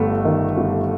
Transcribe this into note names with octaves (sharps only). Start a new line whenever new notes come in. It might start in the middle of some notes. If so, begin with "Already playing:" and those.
Already playing: G1 G2 A3
D#3
G1